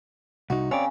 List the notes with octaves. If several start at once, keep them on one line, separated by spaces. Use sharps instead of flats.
C2 D#4 F#4
C#3 C4 C#5 D5